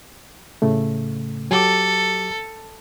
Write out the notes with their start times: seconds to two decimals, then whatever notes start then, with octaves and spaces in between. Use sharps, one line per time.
0.62 A2 C#3 A3
1.51 F#3 G4 A4 D6